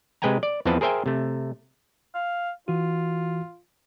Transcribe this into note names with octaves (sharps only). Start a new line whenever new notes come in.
C3 G#3 B4 G5 G#5 A#5
D5
E2 E3 F3 C4 B4 A5
G#4 A#4 C5 E5 G5 G#5
C3 A3
F5
E3 F4 F#4